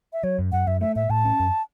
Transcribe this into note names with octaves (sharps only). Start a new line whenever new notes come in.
E5
F#3 C#5
F#2
F#2 F#5
F#2 E5
A3 E5
A2 E5
A2 A5
C#4
F#2